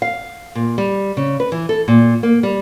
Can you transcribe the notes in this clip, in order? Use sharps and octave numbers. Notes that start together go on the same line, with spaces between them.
F5
A#2
G3
C#3
B4
E3
A4
A#2
A#3
G3